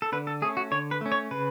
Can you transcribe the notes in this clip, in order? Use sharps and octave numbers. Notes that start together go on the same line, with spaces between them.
A4
D3 B4
A4
A3 C#4 G#4
F#4
D3 C#5
B4
A3 C#4
C#5
C#3 B4